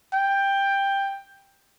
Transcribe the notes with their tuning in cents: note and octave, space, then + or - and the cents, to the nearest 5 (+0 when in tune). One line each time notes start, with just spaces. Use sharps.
G5 +10